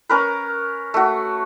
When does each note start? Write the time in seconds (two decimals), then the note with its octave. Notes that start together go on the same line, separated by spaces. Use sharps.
0.09 C#4 A#4 B4
0.94 A3 F#4